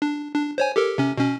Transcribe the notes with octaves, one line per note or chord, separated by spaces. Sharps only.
D4
D4
C5 C#5 G#5
G4 A4 A#4
C3 C#4
B2 C#4